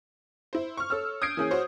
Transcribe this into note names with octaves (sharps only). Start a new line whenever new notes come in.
E4 C5
C#6 F6
A4 C#5 E6 F6
D#6 G6 G#6 C7 D7
E3 A#3 C#4 G#4
F#4 C5 C#5